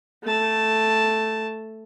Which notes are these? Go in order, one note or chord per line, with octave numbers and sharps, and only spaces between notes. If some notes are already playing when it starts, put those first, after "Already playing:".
A3 A5